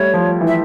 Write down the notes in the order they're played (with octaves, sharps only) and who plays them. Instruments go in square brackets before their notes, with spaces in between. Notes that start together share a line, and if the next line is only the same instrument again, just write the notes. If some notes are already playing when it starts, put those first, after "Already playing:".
Already playing: [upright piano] G3 A3 [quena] C#5
[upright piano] F3
E3
[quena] E5